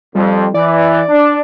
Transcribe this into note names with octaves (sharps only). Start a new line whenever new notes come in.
F2 G3
E3 D5
D4